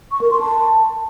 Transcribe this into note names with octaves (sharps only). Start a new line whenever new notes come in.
C#6
A#4
C6
A5